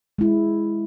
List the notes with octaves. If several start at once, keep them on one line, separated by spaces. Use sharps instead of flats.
G#3 E4